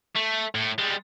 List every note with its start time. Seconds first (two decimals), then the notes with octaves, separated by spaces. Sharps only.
0.16 A3
0.55 A2
0.79 G3 G#3